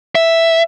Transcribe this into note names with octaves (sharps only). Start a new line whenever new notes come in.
E5